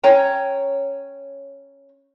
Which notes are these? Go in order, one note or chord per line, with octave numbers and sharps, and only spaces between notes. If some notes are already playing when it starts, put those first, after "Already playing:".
C#4 C#5 G5 A#5